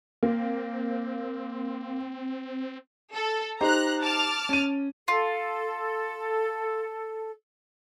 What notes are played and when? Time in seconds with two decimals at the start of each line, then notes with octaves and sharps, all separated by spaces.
0.23 A#3 C4
3.14 A4
3.61 D#4 G4 C5 A#5 F#6
4.04 A5 D6 F6
4.49 C#4 D#7
5.08 F4 A4